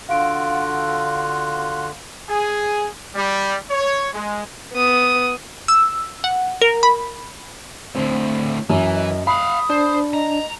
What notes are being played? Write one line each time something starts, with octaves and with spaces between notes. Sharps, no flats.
D3 F4 F#4 F5 D7
G#4
G3
C#5
G#3
B3 D#6
E6
F#5
A#4
B5
D2 A2 C4
F#2 E3
D#5
F5 F#5 B5 D#6
D4 C5
D#5 A#5